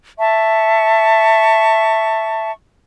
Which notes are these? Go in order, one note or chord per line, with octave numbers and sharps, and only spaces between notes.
E5 A5 C#6